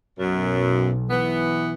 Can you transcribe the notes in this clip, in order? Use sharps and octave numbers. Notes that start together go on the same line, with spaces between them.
B1 F#2
E3 B3